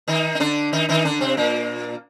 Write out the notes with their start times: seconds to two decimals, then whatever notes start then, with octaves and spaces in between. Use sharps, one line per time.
0.08 D#3 D#4
0.35 D#4
0.40 D3 D4
0.73 D#3 D#4
0.89 D#3 D#4
1.05 D3 D4
1.21 C3 C4
1.37 A#2 A#3